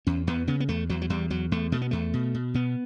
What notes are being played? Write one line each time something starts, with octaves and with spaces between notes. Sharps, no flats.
E2 C#4
E2 B3
C#3 B3
B3
E2 A3
E2 F#3
F#3
E2 G3
E2 F#3
E2 A3
B2 A3
B3
E2 A3
B2
B2
B2 B3